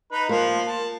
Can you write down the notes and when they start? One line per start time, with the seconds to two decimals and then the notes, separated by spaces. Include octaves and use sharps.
0.12 D#4 B4
0.29 F3 A#3
0.67 A5